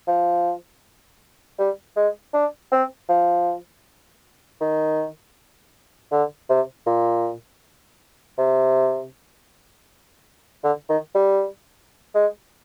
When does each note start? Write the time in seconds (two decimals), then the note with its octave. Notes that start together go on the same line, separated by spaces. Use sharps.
0.07 F3
1.58 G3
1.96 G#3
2.34 D4
2.72 C4
3.09 F3
4.61 D#3
6.12 D3
6.49 C3
6.87 A#2
8.38 C3
10.64 D3
10.89 D#3
11.15 G3
12.15 G#3